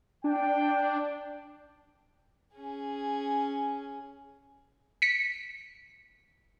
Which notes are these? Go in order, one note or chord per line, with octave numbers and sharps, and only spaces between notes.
D4 G5
C#4 G#4
B6 C#7